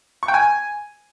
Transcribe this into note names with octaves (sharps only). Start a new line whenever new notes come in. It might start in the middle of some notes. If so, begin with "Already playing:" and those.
C#6
G5
G#5